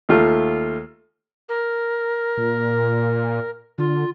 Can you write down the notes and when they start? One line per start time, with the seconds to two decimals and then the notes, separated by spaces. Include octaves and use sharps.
0.09 D#2 A3 F4
1.49 A#4
2.37 A#2
3.78 D3 F4